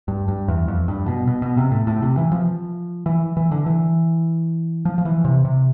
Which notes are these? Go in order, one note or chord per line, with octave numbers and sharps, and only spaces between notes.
G2
G2
E2
F2
G2
B2
B2
B2
C3
A2
A2
C3
E3
F3
E3
E3
D3
E3
F3
F3
E3
C3
C3